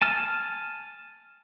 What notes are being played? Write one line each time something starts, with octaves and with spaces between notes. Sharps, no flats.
G#5 A5 F6